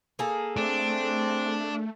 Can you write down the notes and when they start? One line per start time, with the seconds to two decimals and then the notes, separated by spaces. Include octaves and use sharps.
0.19 A#3 G#4 A4
0.57 A3 C4 D4